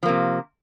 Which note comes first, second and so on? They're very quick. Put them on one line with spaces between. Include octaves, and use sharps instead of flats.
F3 A#3 C3